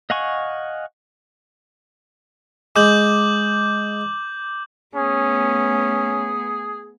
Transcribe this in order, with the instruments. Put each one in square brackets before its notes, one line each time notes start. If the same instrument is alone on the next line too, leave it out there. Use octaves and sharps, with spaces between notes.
[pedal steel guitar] D#5 F5 F#5 G#5 C#6
[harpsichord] G#3 [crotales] D6 G6 F#7
[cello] A3 B3 [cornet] C#4 [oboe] G#4